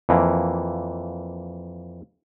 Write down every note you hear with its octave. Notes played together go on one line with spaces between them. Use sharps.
F2 E3 A#3